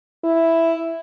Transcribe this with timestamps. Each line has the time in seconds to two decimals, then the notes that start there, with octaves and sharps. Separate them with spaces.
0.24 E4